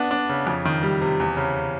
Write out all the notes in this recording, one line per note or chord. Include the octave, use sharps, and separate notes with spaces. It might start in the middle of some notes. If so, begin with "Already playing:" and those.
Already playing: B3 D4
D4
C#3
F2
D#3
G3
C3
E2
C#3